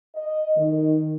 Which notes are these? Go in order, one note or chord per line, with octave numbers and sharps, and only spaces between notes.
D#5
D#3